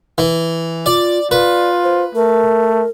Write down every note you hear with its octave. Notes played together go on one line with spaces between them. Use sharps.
E3
F4 D5
F4 B4 D5
C5
A3 A#4